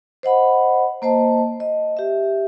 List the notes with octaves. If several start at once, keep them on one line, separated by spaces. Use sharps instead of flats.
C5 D#5 F#5 B5
A#3 C5 D#5 A5
D#5
G4 E5